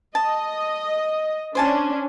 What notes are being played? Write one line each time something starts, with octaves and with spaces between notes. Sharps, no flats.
D#5 A5
C#4 D4 C5 G#5 A5